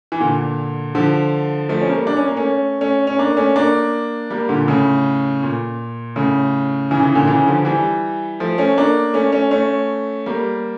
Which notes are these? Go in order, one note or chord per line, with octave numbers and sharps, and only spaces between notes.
E3
A#2 D3
D3 F3
F3 A3
C#4
G3 A#3
D4
C#4
A#3
A3 C#4
A3 C#4
C#4
A#3 D4
A3 C#4
A#3 D4
G3 A#3
A#2 D3
A2 C#3
A#2
A2 C#3
C#3 E3
C#3 E3
A#2 D3
C#3 E3
D3 F3
E3 G3
F3 A3
A3 C#4
A#3 D4
A3 C#4
A3 C#4
A3 C#4
G3 A#3